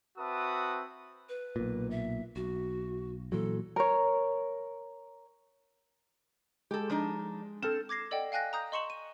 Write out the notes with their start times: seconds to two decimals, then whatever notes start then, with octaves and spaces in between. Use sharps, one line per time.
0.18 C4 F#4 B4 E5 A5 D#6
1.29 B4
1.56 B1 A#2
1.90 E5
2.36 B1 F#4
3.32 A#2 E3 F#3 A4
3.76 A#4 C#5
6.71 G#3 G4 A4
6.90 F3 D4 D#4
7.63 C4 A4 F6 E7
7.89 D6 G#6 A#6 C7
8.11 A4 D5 D#5 F#5 G5
8.32 F5 G5 G#5 F#6 A#6
8.53 A#5 D#6 G6
8.72 D#5 C6 C#6 C#7 E7 F#7
8.90 D#7